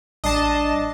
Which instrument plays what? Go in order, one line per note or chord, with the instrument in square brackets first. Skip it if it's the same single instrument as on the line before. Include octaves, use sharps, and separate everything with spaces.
[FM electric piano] A1 G3 C7 [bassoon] D4 [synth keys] D#5 A5